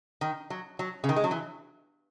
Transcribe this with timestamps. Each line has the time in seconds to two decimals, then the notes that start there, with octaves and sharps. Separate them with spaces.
0.21 D#3
0.50 F#3
0.79 F#3
1.04 C#3
1.09 D#3
1.16 G#3
1.24 F#3
1.31 E3